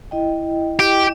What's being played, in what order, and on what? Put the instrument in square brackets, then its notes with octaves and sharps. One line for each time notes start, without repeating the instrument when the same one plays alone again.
[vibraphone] E4 D#5 G5
[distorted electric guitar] G4